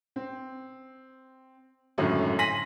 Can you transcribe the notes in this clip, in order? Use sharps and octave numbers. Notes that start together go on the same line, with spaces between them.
C4
G#1 F#2 A2 D3 F#3
G#5 C6 A#6 B6 D#7 F#7